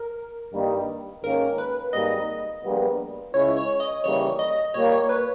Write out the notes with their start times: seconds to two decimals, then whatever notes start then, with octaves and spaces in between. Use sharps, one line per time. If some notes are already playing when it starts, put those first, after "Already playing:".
Already playing: A#4
0.53 G2 D#3 G3 A#3 D#4
1.23 G#2 D#3 A#3 C#4 A#4
1.58 B4
1.93 G#1 G#2 G3 A#3 D#4 D#5
2.63 A#1 A#2 G3 B3
3.34 C#2 C#3 G#3 C#4 E4 C#5
3.57 C#5
3.80 D#5
4.04 D#2 C#3 E3 G3 A#3 C#5
4.39 D#5
4.74 A#2 G3 A#3 C#5
4.92 C#5
5.09 B4